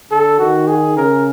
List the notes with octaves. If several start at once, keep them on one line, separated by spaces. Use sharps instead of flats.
D3 A4
D#3 F#4
G#4
C#3 A#4